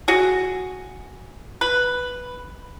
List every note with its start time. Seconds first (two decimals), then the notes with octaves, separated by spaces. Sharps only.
0.08 F#4 G#4
1.61 B4